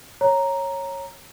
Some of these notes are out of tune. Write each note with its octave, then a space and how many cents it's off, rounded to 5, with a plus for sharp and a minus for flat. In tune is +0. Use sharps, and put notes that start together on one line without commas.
C#5 -15 A#5 +0